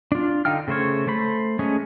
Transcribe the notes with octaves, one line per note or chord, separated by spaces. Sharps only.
D4 F4
D3 D#4 F5 G5 F6
C#3 A3 C5 C#5
A3 C5 B5
G#3 A3 C#4 G#4